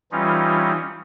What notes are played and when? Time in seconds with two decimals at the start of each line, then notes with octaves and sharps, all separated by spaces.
0.12 E3 G3 C#4 D#4 F4